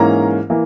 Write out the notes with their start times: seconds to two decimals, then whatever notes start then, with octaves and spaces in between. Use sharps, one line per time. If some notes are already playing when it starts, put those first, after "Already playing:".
Already playing: G#2 E3 A#3 C#4 A#5
0.50 E3 A#3